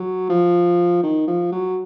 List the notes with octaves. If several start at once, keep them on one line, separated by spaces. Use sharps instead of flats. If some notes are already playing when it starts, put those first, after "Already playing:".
Already playing: F#3
F3
D#3
F3
F#3